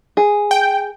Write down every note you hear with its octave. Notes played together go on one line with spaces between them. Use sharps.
G#4
G5